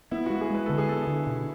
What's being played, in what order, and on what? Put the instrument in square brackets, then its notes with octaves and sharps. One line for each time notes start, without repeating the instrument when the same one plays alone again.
[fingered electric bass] B3 [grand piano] E4
[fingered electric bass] G#3 [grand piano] F#4
[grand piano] G#4
[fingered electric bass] G#3 [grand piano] B4
[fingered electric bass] D3 [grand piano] A4
[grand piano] G#4
[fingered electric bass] B3 [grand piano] A4
[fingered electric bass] D3
B2